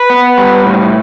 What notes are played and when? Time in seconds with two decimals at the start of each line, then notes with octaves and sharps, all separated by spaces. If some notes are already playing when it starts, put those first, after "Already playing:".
Already playing: B4
0.10 B3
0.38 G3
0.66 A2